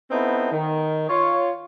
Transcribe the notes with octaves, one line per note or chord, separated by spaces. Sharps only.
B3 C4 D#4 E4 A4
D#3
F4 C#5